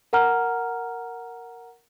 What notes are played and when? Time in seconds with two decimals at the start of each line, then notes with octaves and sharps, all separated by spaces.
0.13 A#4 F#5 A#5 F6